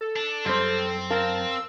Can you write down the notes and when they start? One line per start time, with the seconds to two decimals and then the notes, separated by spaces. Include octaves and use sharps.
0.01 A4
0.16 D4
0.46 F#2 G3 C4 C5
1.10 A#4 F5 A5
1.51 E6